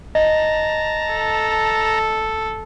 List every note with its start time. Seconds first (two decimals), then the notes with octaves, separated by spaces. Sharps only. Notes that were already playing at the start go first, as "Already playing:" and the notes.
0.15 D#5 A5 A#5
1.14 A4